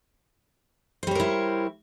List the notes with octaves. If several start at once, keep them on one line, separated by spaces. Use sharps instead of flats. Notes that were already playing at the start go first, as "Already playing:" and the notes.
G3 E4 A#4 C5 C#5